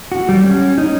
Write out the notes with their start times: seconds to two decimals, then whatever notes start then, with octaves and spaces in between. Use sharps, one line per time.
0.12 F#4
0.29 G3
0.44 C#4
0.78 D#4